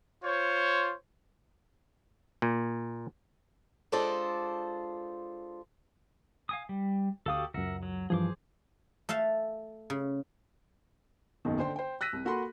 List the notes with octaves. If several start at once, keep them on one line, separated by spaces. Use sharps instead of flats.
F4 C5 C#5
A#2
G#3 D4 F4 A4 C5 D5
F5 G#5 D#6
G3
D2 F#4 G4 A4 F5 D#6
C#2 F#2 A#4 E5 F#5
F#3
G2 E3 F3 G#4 C5 D6
A3 E5 F5 A5
C#3
F#1 B1 B2 D#3
D3 C5 G5 C6
C5 G5
E6 F#6 A#6 B6 D#7
C2
A#3 F#4 A4 B5 C6